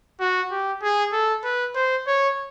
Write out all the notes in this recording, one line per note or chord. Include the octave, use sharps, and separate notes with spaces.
F#4
G4
G#4
A4
B4
C5
C#5